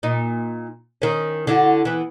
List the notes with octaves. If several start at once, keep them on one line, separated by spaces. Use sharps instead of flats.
A#2 D#4
D#3 C#4
D3 E4 F#4
E3 B3